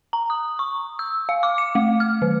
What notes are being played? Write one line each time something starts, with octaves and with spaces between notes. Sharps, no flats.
A#5
D#6
C#6
E6
F5
D6
C#7
A3
F6
D#3